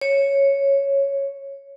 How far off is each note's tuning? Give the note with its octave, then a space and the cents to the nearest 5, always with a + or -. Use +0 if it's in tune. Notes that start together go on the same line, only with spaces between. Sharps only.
C#5 -5